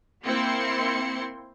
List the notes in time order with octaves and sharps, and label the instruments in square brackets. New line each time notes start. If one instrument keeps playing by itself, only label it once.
[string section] A#3 C4 E4 C6 C#7